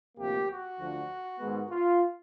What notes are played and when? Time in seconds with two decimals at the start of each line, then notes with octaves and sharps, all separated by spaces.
0.18 D2 C3 F3 A#3 G4
0.49 F#4
0.79 D2 D3 F3
1.40 G#2 D#3 G#3 B3
1.70 F4